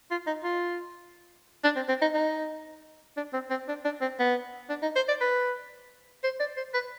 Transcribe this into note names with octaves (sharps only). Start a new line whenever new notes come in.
F4
D#4
F4
D4
C4
C4
D#4
D#4
D4
C4
C4
D4
D4
C4
B3
D4
D#4
C5
D5
B4
C5
D5
C5
B4